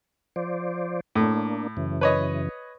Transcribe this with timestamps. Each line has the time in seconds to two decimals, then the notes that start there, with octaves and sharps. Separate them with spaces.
0.36 F3 C5 D5
1.16 A2 A#3 D4
1.77 F#2 C#3 E3
2.01 B4 C#5 D#5